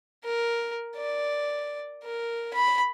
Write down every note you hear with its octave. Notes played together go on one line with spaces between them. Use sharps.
A#4
D5
A#4
B5